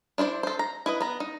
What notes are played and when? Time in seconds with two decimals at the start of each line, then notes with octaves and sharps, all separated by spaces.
0.18 D4 E4 C5 D5
0.43 A4 C5
0.59 A#5
0.86 E4 B4 D#5
1.01 B3 A#5
1.20 D#4